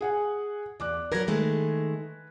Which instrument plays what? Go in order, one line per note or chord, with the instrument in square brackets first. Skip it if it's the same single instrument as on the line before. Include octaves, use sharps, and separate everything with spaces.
[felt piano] G#4 F#5 G#5
[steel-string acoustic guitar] E2 [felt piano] D5 D6 F#6
[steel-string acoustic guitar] F#3 A#4 [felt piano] B4 G#6 A#6
[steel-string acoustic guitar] D#3 G#3 A3